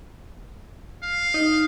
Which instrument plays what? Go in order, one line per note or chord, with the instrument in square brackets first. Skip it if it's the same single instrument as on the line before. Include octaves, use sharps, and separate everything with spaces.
[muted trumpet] F5
[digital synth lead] D#4